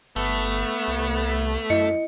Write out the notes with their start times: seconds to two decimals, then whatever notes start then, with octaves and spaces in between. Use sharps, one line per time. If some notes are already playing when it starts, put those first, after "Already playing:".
0.16 G1 A3 B3
0.88 C2
1.70 F#2 E4 D#5 C#7